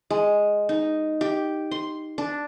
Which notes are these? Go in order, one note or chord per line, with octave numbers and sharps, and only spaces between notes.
G#3
D#4
G4
C6
D4